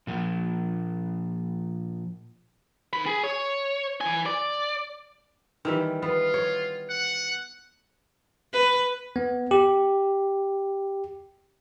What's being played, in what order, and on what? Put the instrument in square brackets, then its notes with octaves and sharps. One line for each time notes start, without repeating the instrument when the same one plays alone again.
[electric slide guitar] A#2 F3
[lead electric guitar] D#3 B5
G#4
C#5
E3 G#5
D5
[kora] D#3 E3 G3
[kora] B3 [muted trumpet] F4
[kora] C#5
[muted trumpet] F#5
[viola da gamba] B4
[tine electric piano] B3
G4